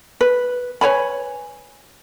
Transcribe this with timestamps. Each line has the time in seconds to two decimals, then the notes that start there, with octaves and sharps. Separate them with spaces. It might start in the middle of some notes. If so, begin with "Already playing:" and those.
0.21 B4
0.81 B4 C#5 G#5 B5